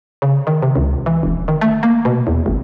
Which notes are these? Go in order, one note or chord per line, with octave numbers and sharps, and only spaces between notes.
C#3
D#3
C3
C#2
E3
E1
D#3
A3
A#3
B2
E2
G#1